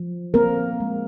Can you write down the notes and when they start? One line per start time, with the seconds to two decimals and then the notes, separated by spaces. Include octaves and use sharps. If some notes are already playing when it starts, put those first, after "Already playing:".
Already playing: F3
0.34 A#3 C4 A#4
0.80 G#3